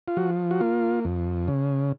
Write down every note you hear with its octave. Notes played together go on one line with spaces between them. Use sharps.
F4
F3 F#4
F#4
A#3 F4
F2
C#3